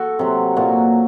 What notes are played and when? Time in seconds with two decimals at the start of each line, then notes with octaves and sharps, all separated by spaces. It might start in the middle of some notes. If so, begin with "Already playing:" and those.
Already playing: F#4 A4
0.19 C3 F#3
0.56 A#2 F#3 F#4